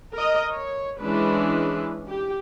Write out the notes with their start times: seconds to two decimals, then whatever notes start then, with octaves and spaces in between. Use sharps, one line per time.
0.14 A#4 D#5
0.51 C#5
1.00 E3 G#3 C#4 D4 B4
2.09 G4